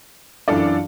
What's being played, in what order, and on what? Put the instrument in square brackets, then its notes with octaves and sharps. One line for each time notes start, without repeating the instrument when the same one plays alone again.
[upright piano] F#2 E3 D4 [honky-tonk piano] F4 A4 D5